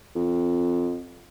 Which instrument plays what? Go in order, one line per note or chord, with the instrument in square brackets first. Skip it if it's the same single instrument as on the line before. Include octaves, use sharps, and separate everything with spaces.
[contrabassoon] F2